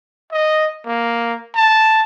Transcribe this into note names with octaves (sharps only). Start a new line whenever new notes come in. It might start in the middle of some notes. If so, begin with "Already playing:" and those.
D#5
A#3
A5